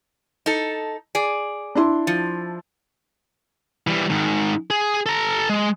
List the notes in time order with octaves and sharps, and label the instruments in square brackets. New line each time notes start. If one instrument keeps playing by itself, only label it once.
[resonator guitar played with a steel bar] D#4 A4
G#4 D5
[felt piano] D4 E4 C6
[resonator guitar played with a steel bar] F3
[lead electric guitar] E3 G3
G#2 D#3
G#4
A4 A#5
G#3